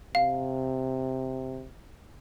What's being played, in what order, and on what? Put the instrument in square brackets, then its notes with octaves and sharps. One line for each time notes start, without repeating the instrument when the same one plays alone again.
[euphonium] C3 [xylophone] F5